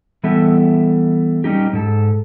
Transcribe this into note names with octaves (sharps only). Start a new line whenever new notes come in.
E3 G3 B3 A4 E5
G3 C#4 D#4 G4
G#2 A4